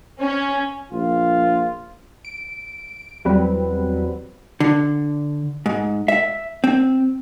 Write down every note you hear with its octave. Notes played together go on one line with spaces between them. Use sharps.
C#4
A#1 F4
D7
E2 F#3 G3 C4 B4
D3
G#2
E5
C4